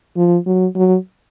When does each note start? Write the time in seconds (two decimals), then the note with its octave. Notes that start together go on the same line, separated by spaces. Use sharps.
0.17 F3
0.46 F#3
0.76 F#3